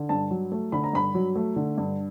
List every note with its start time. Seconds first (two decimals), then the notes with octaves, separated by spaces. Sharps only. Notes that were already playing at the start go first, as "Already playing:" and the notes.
Already playing: D3
0.09 G2 A5
0.31 F#3
0.52 A3
0.72 D3 B5
0.84 A#5
0.93 G2 B5
1.15 F#3
1.36 A3
1.56 D3
1.78 G2